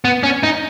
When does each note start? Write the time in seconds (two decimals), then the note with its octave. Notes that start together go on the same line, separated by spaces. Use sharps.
0.05 B3
0.23 C#4
0.43 D#4